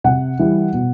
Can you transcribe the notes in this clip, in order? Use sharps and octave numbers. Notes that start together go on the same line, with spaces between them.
C3 F#5
E3 G3
B2